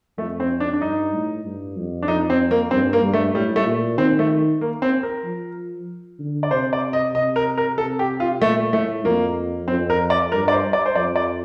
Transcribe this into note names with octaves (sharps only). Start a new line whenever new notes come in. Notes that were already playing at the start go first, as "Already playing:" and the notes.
F2 A3
C4
D4
D4
G2 D#4
A2
G2
F2
D4
F2 D#4
C4
A#3
G2 C4
A#3
G2
A3
A2 G3
A3
A#2
D#3 C4
A3
A#3
C4
A#4
F3
D3
D5
C3 C5
D5
D#5
C3 D#5
A#4
A#4
C3 A4
G4
F4
A#2 A3
A2 A3
F2 A#3
F2 C4
A#4
D5
G2 A#4
D5
C5
D5
C5
F2 D5
D5